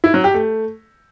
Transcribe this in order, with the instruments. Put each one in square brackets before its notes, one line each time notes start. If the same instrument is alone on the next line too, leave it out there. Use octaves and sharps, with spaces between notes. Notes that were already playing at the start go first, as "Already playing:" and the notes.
[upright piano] E4
F#3
G4
A3